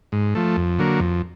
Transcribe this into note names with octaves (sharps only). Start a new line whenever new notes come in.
G#2
F3 A3
F2
D3 F#3 A#3
F2